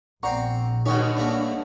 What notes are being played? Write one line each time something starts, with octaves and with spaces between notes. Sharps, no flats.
A#1 C4 C5 D5 F#5 A#5 C#6
G2 B2 D#3 C#4 D#4 F#4 C#5
A3 A#3 D4 F#4